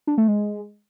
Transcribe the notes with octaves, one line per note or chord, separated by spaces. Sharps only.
D4
A3
G#3